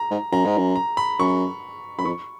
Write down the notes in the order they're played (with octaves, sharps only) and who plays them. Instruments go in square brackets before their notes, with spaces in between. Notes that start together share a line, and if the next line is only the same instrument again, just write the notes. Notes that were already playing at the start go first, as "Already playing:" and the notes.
Already playing: [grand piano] A#5
[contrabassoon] G#2
[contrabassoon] F#2 [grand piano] A#5
[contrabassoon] G#2
F#2
[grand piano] A#5
B5
[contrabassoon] F#2 [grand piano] C#6
[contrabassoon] F#2 [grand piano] B5
[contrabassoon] F2 [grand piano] C#6